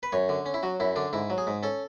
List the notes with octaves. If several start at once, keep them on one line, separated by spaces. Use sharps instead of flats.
B4
F#2 C#5
D3
C#4
E4
F#3 F#4
F#2 E4
D3 D4
G#2 E4
F#3
G#4
G#2
C#4 A4